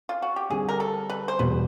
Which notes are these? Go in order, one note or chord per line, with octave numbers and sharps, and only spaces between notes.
F4
F#4
G4
D3 G3 C4 G#4
A#4
A4
B4
C5
E1 E2 B2 G3 B4